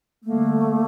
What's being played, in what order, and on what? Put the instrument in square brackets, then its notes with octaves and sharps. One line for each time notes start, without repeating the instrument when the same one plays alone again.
[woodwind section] D3 G3 A#3 [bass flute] A3
[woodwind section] D3 G3 A#3